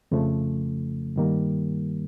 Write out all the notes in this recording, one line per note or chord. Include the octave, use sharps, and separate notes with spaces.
F2 C#3 F3 A3
G2 D#3 G3 A#3